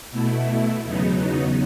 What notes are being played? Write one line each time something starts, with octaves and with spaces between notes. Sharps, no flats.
B2 A3 E4
E2 C#3 F#3 B3 D#4